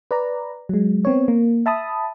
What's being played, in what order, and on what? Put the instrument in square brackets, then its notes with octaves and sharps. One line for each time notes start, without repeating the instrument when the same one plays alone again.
[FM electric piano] B4 D5 A#5
F#3 G#3
B3 C4 C#5
A#3
E5 A5 B5 D#6